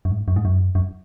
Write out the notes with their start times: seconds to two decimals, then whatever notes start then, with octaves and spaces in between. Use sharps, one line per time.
0.05 F#2
0.11 G#2
0.28 F#2
0.36 G#2
0.45 F#2
0.75 F#2